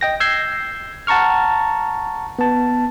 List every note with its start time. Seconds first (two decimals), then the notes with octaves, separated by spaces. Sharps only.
0.01 D#5 G5 A#6
0.20 E6 G6 G#6 C7
1.07 F#5 A5 A#5 C#6 F6
2.39 B3 A5